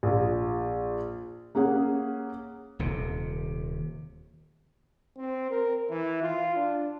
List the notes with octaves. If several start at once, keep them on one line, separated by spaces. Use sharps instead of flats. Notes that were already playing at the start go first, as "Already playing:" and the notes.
A#1
A#3 C#4 G#4 F#5
D#1 D#2 C3
C4
A#4
E3
F4
D4